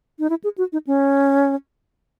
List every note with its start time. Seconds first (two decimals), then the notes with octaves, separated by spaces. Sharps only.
0.19 D#4
0.30 E4
0.44 G#4
0.58 F#4
0.73 D#4
0.87 C#4